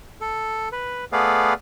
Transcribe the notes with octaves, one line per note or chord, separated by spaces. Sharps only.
A4
B4
A3 B3 G#4 B4 D5 F5